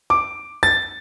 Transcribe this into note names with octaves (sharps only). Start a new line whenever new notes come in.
D6
A6